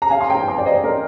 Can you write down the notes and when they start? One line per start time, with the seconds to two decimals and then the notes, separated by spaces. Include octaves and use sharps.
0.02 A#5
0.10 F5 G#5
0.21 C6
0.30 G5 A#5
0.47 G#5 C6
0.58 D5
0.65 C5 D#5
0.84 A#4